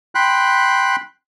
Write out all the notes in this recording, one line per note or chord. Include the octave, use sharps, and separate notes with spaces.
G5 B5 C6 F#6